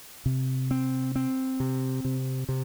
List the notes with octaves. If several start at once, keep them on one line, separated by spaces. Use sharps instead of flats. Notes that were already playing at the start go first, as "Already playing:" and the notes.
C3
C4
C4
C3
C3
C3